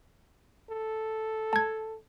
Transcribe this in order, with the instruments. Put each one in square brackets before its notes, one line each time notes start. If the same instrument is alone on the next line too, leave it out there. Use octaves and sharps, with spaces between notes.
[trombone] A4
[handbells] A5 G#6